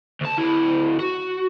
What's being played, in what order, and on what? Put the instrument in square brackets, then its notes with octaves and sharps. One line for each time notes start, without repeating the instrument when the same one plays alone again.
[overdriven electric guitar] D2 A5
D2 E4
F#4